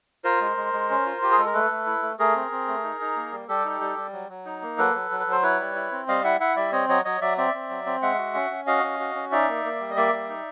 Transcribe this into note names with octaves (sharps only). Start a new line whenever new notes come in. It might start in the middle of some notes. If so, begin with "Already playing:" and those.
F4 A#4 C5
G#3
G#3
G#3
C#4
F4
F4 G4
G#4
G#3 A4
A#4
A3 A4 B4
A3
E4
A3
A3 G#4 A#4
C4
C4
A3
D#4
D#4
A#3
G3
G3 G4 A4
D#4
G3
G3
F#3
F#3
D#4
A#3
F#3 A4 B4
F#3
F#3
B4
F#3 C5
E4 B4 C#5
G3
E4
C4
G3 D#5 F5
E4 E5 F#5
E4 E5 F#5
G3 D5 E5
C4 C#5 D#5
F#3 C#5 D#5
F#3 C#5 D#5
F#3 D5 E5
C4 D5 E5
C4
F#3
C4
G#3 E5 F#5
F#4
C#4
C#4
F#4 D#5 F5
C#4
F#4
C#4
D#4 D5 E5
A#3
A#3
G3
D#5
A#3 D5 E5
G3
D#4